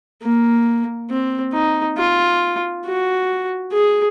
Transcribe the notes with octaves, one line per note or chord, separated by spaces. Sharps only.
A#3
C4
D#4
F4
F#4
G#4